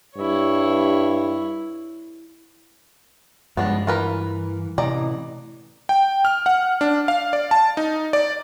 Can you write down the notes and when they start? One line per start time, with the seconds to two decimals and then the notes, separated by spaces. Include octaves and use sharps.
0.17 G2 E4 C#5
3.57 G2 F3 G#3 B3 D4
3.87 E3 F4 A#4 B4
4.78 A2 C3 D#3 E3 D5 D#5 A#5
5.89 G5
6.25 F6
6.46 F#5
6.81 D4
7.08 F5
7.33 D5
7.51 A5
7.77 D#4
8.13 D5